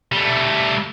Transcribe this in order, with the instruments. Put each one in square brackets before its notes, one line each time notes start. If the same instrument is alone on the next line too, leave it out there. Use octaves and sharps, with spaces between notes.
[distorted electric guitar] G3 A3